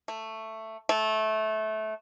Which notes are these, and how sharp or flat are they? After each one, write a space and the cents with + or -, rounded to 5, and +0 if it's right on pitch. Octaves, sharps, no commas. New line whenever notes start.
A3 +10
A3 -20